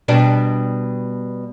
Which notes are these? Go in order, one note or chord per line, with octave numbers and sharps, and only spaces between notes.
B2 G3 D4